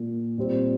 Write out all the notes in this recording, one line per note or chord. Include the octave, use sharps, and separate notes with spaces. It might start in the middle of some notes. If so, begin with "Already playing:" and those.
Already playing: A#2 A#3
A#2 G3 C4